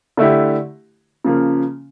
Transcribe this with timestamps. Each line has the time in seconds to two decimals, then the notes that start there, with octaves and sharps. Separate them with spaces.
0.17 D3 A3 E4 G4
1.25 C#3 F3 A#3